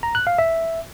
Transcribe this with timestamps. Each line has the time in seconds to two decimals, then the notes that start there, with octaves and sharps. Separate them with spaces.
0.03 A#5
0.15 F#6
0.27 F5
0.39 E5